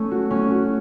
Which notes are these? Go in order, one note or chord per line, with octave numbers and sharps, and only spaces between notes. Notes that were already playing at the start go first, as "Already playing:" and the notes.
Already playing: A3 C#4
F#4
C#4
F#4